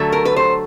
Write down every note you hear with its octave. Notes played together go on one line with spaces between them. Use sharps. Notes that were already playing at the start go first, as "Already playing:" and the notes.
Already playing: D3 F#3 A3
A#4
B4
C5